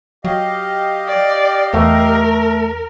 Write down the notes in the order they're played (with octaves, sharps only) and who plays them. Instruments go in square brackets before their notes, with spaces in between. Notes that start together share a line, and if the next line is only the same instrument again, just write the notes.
[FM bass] F#3 [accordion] G4 D#5 F5
[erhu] D5
[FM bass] E2 [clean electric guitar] A3 [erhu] A#4